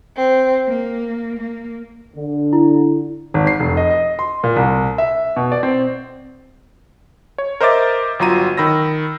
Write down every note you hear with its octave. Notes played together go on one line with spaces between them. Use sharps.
C4
A#3
A#3
D3
E4
G#1
C7
F1
D#5
D#5
C6
A#2
C2
E5
B2
D5
C4
C#5
A#4 C5 D#5 E5 D6 A6
G1 F#3 F4 A#5 D#7
D#3 B5 E6 A#6